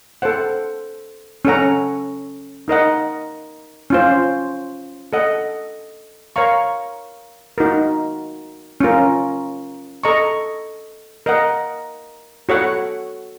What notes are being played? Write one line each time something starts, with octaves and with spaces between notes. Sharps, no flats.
A4 C5 F#5
C#4 A4 C#5 F#5 A#5
D#4 A#4 D#5 F#5
C#4 F4 C5
A4 D#5 F#5
A#4 C#5 F5 A#5 C#6
D#4 F#4 A#4
C#4 F4 A#4
A4 D#5 A#5 C#6
A#4 D#5 F#5
F#4 A4 C#5 F#5